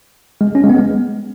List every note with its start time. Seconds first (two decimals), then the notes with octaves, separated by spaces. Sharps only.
0.41 G#3
0.55 C#4
0.64 G#3
0.69 B3
0.78 G#3